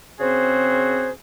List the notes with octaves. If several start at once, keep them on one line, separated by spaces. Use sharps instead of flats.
C#3 C4 F#4 G#4 C5